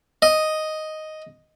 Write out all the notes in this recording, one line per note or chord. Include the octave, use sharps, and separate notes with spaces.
D#5